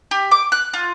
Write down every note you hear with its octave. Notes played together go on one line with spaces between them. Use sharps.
G4
D6
F#6
F4